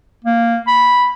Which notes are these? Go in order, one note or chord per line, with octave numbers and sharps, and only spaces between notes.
A#3
B5